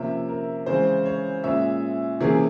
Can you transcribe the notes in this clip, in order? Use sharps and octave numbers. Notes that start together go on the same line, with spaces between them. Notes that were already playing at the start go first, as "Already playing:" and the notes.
Already playing: C3 F3 A#3 C#4 E5
A#4
C#3 E3 G#3 C4 C5
C#5
A#2 G#3 C#4 E5
C3 E3 A#3 C#4 G#4